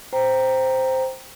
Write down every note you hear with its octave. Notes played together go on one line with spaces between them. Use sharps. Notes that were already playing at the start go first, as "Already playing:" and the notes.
C5 G5 A#5